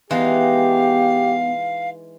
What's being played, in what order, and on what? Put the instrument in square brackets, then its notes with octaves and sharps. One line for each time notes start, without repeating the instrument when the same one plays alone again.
[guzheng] E3 G#3 D#4 [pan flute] B3 [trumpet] G4 [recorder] F5